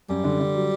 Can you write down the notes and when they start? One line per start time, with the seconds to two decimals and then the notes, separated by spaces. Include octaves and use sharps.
0.09 F#2 G3
0.24 D3
0.40 D3
0.55 F#3